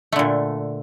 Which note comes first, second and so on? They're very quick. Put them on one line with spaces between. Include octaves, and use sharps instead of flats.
A3 D3 A#2